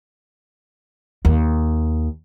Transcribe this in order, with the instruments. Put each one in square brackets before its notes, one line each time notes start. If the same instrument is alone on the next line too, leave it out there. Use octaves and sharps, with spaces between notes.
[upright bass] D#2